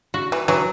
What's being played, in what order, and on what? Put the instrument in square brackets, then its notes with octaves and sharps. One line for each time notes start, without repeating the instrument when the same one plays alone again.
[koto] F#4
[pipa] E3
[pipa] E3 [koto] F#3